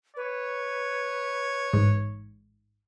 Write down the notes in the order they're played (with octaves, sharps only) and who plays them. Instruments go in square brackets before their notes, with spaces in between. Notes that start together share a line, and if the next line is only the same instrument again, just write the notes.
[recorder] B4 [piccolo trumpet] C#5
[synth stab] A1 G#2